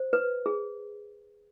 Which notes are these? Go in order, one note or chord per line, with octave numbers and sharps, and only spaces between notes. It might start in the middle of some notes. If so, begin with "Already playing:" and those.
Already playing: C5
B4
G#4